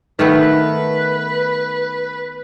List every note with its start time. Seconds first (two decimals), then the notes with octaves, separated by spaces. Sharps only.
0.19 D#3 A3 B3 B4